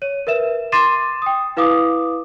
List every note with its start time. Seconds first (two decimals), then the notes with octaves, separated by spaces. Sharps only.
0.02 C#5 D#7
0.27 A#4 B4 E5 E7
0.72 C6 D6 A6 C7 D#7 E7
1.22 G5 D#6
1.57 E4 B4 F5 D6 D#6